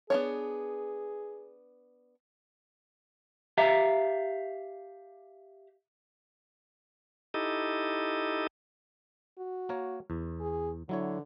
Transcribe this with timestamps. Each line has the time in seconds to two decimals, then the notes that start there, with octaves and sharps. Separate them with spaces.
0.10 B3 D4 G#4 C#5
3.58 G4 E5 F5 A#5
7.34 D#4 E4 G4 A4 D#5
9.38 F#4
9.69 A#3 A#4 C#5
10.10 E2
10.40 G#4
10.89 D3 F#3 E4 C#5